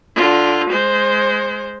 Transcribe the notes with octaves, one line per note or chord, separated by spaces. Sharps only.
D3 F4
G#3 C5